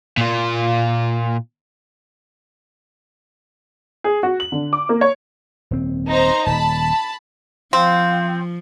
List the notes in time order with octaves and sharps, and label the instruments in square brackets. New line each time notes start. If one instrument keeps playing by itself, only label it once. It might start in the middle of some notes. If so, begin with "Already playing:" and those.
[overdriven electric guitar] A#2 F4
[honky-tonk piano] G#4
F#4
F#7
D3
D6
A#3
C#5
[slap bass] D#1 C4
[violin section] D#4 C5 A#5
[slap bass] D#1 [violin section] A5 B5
[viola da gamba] F3 [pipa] C4 [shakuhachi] F5